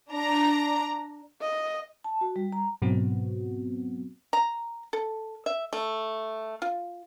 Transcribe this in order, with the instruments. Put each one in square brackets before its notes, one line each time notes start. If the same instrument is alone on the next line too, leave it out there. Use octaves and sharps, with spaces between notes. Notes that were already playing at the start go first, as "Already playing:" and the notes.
[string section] D4 A#5
[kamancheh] D#5
[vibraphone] A5
F#4
G3
A#5
[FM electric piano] G#2 B2 F#3 B3 C4 F#4
[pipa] A#5
A4
E5
A3
F4